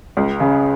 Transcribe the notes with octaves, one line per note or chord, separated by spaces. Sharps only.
C#2
C#3